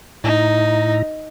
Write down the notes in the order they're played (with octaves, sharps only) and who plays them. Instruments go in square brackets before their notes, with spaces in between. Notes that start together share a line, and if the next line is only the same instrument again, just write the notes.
[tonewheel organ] A2 E4 A#5 [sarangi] D#4